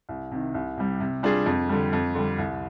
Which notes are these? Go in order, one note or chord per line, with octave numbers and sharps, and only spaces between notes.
C2
C3 D#3
C2
C3 G3
C3
G3 D4 F4 G#4
F2
D3 G3
F2
D3 G3
C2